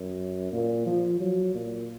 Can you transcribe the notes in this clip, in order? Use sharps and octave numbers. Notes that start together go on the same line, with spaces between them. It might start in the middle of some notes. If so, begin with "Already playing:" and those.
Already playing: F#2
A#2
F3
F#3
A#2